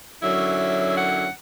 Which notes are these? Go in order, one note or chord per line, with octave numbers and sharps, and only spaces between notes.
F#2 D3 F#3 C#4 E4 E5
F#5